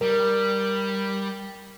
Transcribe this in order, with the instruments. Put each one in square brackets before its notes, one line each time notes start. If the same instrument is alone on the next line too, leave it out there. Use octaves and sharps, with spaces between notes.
[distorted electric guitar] G3 [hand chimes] A#4